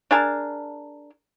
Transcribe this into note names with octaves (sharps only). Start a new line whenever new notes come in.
D4 G#4 A#4 A5